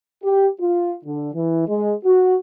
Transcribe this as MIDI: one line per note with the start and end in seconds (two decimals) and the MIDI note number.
0.24 0.47 67
0.60 0.94 65
1.05 1.29 50
1.34 1.66 52
1.67 1.94 56
2.04 2.35 66